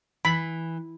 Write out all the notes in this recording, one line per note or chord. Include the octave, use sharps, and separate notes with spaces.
E3 B5